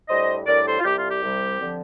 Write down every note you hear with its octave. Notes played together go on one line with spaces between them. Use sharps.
A2 G3 D4 C5 D#5
A2 G3 D4 A#4 D5
A4 C5
F4
C2 C3 G3 G4
F4
G4
C2 C3 G3
D3 F3 C4